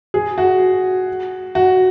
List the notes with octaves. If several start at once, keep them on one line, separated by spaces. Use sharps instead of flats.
G#4
F#4
F#4